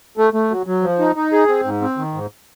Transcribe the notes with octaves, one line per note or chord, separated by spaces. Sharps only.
A3
A3
F#3
F#3
F3
D#4
D#4
G#4
C4
G#2
C4
D#3
G#2